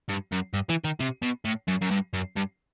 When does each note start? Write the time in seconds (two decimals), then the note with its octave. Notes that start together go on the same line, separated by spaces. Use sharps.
0.09 G2
0.32 F#2
0.53 G2
0.69 E3
0.84 D#3
1.00 C3
1.23 B2
1.45 A2
1.68 F#2
1.82 F#2
1.91 G2
2.14 F#2
2.36 G2